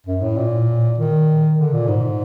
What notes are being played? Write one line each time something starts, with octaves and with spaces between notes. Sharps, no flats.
F#2
A2
A#2
D#3
D3
A#2
G#2